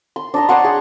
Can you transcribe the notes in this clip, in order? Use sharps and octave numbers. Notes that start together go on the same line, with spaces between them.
C6
D4 D#5 A#5
C#5 D5 F#5 C6
G#4